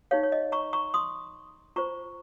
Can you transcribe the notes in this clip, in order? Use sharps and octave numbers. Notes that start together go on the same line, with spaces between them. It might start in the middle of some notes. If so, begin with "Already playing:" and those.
D#4 G4 C#5 F5
C#5
D#5
A#5 C#6
A#5 C#6
C6 D#6
F4 C5 A#5 C#6